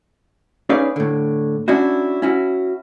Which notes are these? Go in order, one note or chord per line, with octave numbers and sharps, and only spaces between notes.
C#4 D#4 G#4 B4 D5 F5
A2 D3
C#4 D4 E4 F#4
C#4 E4 F#4